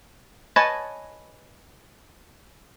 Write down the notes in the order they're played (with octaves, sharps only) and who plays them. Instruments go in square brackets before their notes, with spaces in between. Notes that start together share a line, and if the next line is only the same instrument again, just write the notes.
[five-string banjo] B4 C#5 D#5 G#5 A5